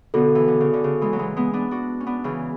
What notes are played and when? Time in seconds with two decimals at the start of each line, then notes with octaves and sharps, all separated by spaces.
0.14 B2 D3 B3 F#4 A4
0.35 E3
0.48 D3
0.61 C#3
0.73 D3
0.84 C#3
1.01 E3 G#3
1.13 F#3
1.19 E3 G#3
1.36 G#3 B3
1.53 B3 D4
1.71 D4 F#4
2.00 C#4
2.06 B3 D4
2.24 C#3 E3